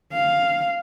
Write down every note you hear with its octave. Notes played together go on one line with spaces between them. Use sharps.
F5